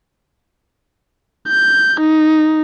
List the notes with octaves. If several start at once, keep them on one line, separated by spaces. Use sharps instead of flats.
G6
D#4